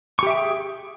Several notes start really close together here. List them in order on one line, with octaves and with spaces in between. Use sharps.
C#6 G4 E5 G5 G#4